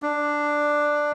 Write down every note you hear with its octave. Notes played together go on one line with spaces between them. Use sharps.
D4